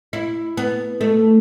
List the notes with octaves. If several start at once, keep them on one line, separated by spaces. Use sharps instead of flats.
E4
B3
A3